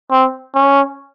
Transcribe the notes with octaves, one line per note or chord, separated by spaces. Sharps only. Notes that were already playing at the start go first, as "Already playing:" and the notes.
C4
C#4